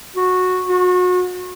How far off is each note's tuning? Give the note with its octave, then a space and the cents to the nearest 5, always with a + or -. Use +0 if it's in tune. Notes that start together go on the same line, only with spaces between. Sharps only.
F#4 -10
F#4 -35